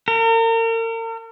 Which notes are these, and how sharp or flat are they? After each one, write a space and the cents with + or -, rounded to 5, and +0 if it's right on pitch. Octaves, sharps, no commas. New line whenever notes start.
A#4 -40